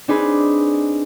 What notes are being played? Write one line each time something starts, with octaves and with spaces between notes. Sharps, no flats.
C4 D4 D#4 G#4 B4